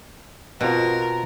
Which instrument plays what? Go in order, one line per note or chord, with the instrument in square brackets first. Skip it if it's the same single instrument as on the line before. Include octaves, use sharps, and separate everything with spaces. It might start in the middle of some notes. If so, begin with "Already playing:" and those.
[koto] B2 [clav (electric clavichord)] B3 C4 F4 [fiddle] A#4